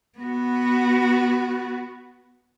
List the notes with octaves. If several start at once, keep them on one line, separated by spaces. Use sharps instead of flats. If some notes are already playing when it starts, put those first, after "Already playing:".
B3 F#4